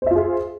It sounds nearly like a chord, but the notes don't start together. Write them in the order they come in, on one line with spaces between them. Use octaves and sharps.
C5 E5 F4 G#4